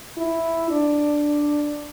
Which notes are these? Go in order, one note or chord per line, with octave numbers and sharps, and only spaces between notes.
E4
D4